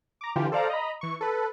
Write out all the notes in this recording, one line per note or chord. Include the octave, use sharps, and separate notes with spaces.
A#5 D6
D3 E3 F4 G4
A4 C5 D5 F5 A#5
D#5 A#5 B5
E3 C#6
A4 B4